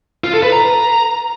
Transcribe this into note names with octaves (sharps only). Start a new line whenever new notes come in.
F4
A4
B4
A#5